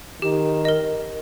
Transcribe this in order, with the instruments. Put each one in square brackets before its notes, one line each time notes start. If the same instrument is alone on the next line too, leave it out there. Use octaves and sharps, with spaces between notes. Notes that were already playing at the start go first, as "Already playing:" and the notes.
[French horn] D#3 [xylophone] G4
[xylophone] A#4 D#5